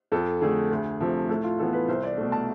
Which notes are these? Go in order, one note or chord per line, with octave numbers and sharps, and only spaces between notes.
F2 A4
D3 A3 G#4
D2
C3 F3 A3
A2 A4
F4
E3 B3 A4
B4
C2 C5
D5
B2 A3
A5